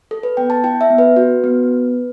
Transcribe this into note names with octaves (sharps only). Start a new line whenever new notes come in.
A4
B4
B3 G5
A5
E4 G5
E5
B3
B4
F#4
B3